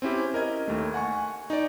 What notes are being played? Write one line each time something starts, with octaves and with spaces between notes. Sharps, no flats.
C4 C#4 E4 G4
A#4 D#5 G#6
D#2 A3
F#5 G#5 C#6
D#4 D5